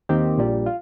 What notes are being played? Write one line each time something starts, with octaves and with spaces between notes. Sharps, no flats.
D#2 D#3 C4 G4
A#1 A#2 G3
F4